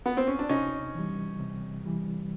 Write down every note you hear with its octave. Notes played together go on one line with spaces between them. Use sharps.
B3
C4
C#4
D4
C3 C#4 D#4
E3 G3
C3
E3 G3